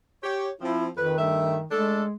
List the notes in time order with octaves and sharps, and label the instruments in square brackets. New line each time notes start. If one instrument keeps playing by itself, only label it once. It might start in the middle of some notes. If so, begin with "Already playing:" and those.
[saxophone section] G4 C#5
[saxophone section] F3 C4 [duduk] E4
[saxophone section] F2 B4 [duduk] D#3
[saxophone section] G2 A3 E5
[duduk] G#3 [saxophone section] A3 D4 A4